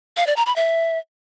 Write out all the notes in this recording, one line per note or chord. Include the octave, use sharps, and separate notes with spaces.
F5
D5
A#5
B5
E5